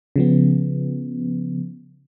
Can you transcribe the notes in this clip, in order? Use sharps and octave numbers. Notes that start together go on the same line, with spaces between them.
C#3 F3 B3